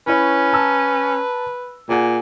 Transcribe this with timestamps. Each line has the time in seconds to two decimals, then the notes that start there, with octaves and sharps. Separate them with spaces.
0.07 C#4 E4 B4 C#5
0.53 A5 A#5 E6
1.89 A#2 G#4 F#5 G#5